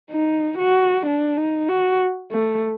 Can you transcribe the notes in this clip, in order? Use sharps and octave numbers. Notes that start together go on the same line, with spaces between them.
D#4
F#4
D4
D#4
F#4
A3